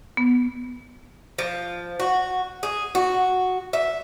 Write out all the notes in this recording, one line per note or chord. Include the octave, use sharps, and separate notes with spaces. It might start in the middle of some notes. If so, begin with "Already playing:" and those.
B3
F3
F#4
G#4
F#4
E5